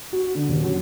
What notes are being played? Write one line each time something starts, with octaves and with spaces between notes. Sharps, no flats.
F#4
D3
D#1
F#2